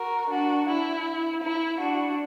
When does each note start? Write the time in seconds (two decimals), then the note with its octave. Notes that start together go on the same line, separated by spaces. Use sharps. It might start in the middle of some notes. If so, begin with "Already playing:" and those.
Already playing: F#4 A#4
0.31 D4 F#4
0.67 E4
1.42 E4
1.78 D4 F#4